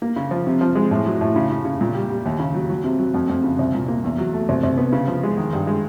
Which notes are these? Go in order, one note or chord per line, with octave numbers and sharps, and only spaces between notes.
A#3
C#3
F3
C3
F3
G#3
A2
F#3
A2
C#3
C#3
C#3
A#2
G3
G3
D#2
C#3
F#3
F#3
C3
F#3
F2
F2
C#3
C2
A#2
A#3
E2
F#3
A3
C2
C2
B3
C#3
F3
G#3
D#3
G2
G#3